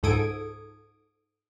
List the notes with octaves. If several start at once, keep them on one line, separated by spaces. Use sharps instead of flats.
C#2 G#2 A4 D#6 G#6 D7